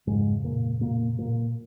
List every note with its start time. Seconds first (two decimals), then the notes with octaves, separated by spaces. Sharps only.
0.07 F2 G#2 C#3 G#3
0.44 A#2 A#3
0.81 A#2 A#3
1.18 A#2 A#3